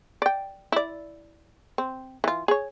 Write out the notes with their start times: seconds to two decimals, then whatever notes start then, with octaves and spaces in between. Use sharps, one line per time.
0.22 D5 G5
0.72 E4 D5
1.78 C4
2.24 E3 F4
2.48 G#4 C#5